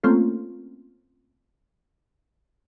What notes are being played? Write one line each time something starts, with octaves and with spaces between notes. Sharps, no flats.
A3 A#3 C4 C#4 F4 A4